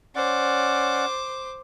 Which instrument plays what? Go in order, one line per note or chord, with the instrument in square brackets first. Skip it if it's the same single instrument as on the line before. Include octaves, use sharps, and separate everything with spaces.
[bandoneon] C#4 D5 F#5 [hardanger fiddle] C5 D6